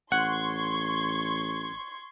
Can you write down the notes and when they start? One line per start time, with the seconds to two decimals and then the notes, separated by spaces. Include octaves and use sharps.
0.12 A1 F#5 C6 C#6 G#6